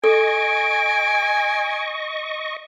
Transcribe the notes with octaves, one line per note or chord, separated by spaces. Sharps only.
A4 D#5 G#5 C#6 D7